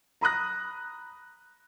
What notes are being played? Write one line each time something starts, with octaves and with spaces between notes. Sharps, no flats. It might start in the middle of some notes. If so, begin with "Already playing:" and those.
A#5 B5 D#6 F#6 A#6